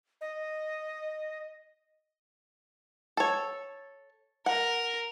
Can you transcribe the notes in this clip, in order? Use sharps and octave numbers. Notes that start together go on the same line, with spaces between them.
D#5
A4 C#5
A#4 F#5